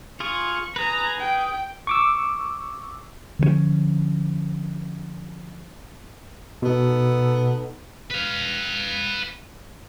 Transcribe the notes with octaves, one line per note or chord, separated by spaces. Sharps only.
F4 G#4 C#6
G#4 B4 A#5
G5
C#6 D6 E6
D3 F3 G3 C#4
B2 B3 D#4 A4
B4 F5